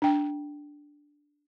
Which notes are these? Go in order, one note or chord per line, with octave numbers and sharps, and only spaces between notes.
D4 G5